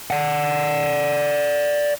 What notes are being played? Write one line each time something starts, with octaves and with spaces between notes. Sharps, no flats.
D5 F#5